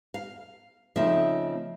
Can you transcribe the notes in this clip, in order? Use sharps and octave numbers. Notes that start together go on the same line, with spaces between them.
F5
C#3 F3 A3 C4 D#4 E5